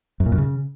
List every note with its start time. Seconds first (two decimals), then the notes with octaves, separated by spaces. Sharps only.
0.20 F#2
0.26 A#2
0.32 F#2
0.38 C#3